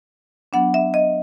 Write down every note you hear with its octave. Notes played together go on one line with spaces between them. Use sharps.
F#3 B3 D4 F#5
E5
D#5